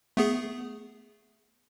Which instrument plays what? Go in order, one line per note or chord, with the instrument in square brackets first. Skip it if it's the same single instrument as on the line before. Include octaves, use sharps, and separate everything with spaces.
[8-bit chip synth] A3 B3 G#4